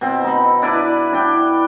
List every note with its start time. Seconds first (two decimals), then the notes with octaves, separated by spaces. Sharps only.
0.01 B2 C4
0.24 D#4 B5
0.62 D4 E4 B4 D5
1.12 D4 E4 G5